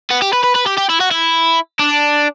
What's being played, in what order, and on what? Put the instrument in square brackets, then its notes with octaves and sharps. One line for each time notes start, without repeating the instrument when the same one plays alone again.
[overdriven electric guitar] B3
G4
B4
B4
B4
G4
G4
E4
F#4
E4
D4